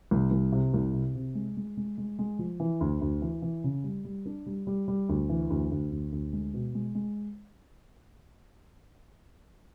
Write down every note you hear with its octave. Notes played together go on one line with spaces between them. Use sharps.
C2
C2
C3
C2
C3
C3
G#3
G#3
G#3
G#3
G#3
F3
E3
D2
D2
E3
E3
C#3
G3
G3
D4
G3
G3
G3
D2
E3
D2
D2
D2
D2
G#3
B2
G#3
G#3